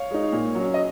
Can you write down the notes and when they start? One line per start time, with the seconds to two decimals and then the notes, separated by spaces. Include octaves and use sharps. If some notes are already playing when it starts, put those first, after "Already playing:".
Already playing: C#5 F5
0.11 G#3 D#4
0.32 A#2
0.55 F#3 C#4
0.74 D#5